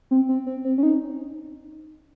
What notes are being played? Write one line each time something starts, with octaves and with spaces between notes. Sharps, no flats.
C4
C4
C4
C4
C#4
D#4